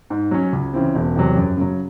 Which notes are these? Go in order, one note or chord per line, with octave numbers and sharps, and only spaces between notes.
G#2
F#3 C#4
C#2
C#3 E3 C4
E1
E2 C3 F#3
F#2
C#3 F#3